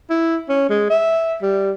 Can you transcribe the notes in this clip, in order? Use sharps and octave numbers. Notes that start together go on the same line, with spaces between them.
E4
C#4
G#3
E5
G3